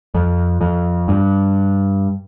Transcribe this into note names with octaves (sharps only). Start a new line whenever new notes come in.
F2
F2
G2